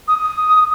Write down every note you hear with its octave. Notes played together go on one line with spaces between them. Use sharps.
D#6